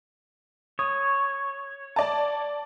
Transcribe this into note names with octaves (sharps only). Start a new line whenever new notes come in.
C#5 D#6
D5 A5